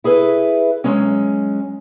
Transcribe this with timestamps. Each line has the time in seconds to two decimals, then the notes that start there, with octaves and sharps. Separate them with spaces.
0.04 E4 G#4 A4 B4
0.84 F#3 G#3 C#4